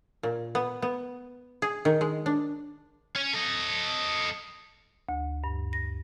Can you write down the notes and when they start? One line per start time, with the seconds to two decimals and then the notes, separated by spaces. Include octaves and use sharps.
0.23 A#2
0.55 B3
0.82 B3
1.62 G#4
1.85 D#3
2.01 G#3
2.26 D4
3.16 C#4
3.33 A4 D#5
5.09 D2
5.44 G2
5.73 A#6